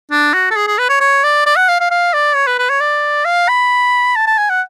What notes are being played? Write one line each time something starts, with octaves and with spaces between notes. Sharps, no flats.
D4
F#4
A4
G#4
G#4
B4
C#5
C#5
D5
D5
F#5
F5
F5
F5
D5
C#5
B4
B4
C#5
D5
F5
B5
A5
A5
G#5
F#5